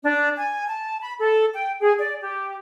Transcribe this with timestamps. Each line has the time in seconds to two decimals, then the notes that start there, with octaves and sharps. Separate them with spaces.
0.03 D4
0.37 G#5
0.68 A5
1.01 B5
1.19 A4
1.54 G5
1.80 G#4
1.99 D5
2.22 G4